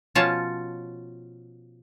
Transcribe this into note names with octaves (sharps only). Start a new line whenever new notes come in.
B2 F3 C#4 F4 C#5 A5